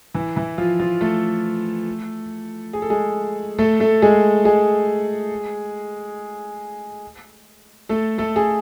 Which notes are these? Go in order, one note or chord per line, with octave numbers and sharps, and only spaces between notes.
E3 E4
E3 E4
F3 F4
F3 F4
A3 A4
G#4
A4
G#3 G#4
A3 A4
A3 A4
G#3 G#4
G#3 G#4
A3 A4
A3 A4
G#4